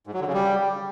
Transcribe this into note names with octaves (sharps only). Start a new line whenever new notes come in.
G#2
F#3
D3
C#3
G3